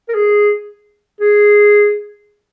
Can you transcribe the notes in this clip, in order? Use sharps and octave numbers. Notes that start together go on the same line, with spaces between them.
A#4
G#4
G#4